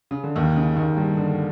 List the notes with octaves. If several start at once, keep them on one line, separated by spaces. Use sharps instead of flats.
C#3
D3
D#2 D#3
C#3
D#2 D#3
G2 G3
D3